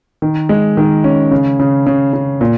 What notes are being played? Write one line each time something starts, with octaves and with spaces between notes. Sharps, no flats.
D#3
G#3
D#3
C#4
C#3
C#3
C#3
C#3
A#2